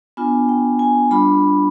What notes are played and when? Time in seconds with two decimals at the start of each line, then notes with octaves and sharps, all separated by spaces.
0.17 B3 D4 F4 G#5
0.49 G5
0.79 G#5
1.11 G3 D4 F4 B5